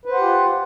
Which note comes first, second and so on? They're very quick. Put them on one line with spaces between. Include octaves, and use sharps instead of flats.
B4 C5 F#5 G4 F4